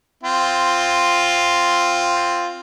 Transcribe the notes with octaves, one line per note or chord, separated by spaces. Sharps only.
C4 F4